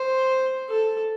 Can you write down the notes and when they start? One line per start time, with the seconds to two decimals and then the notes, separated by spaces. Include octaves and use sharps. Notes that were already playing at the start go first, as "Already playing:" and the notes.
Already playing: C5
0.69 A4